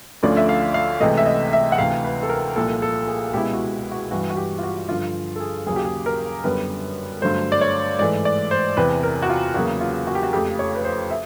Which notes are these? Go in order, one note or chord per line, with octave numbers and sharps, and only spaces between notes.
D2 D3 F3 A3 C#4 D5
E5
F5
F5
C#2 C3 E3 A3 D#5
E5
D#5
E5
F#5
D2 C3 E3 F5
B4
A4
A#4
C2 A#2 F3 A#3 A4
A4
G#4
C#2 B2 G#3 B3 E4 G4
F#4
F#4
G2 E3 G3 F#4
F#4
G4
F4
F#4
G2 D3 F3 F4
A4
G#4
D#2 C#3 F#3 G#4
G4
G#4
A#4
F#2 D3 G3 B3 B4
G2 D3 F#3 A3 C5
D5
C#5
G#2 E3 A3 D5
D5
C5
E2 C3 E3 B4
A#4
F#4
F4
E2 C#3 F#3 A#3 F#4
F4
F#4
G4
F#4
F2 C#3 F3 A3 G4
C#5
B4
C5
E5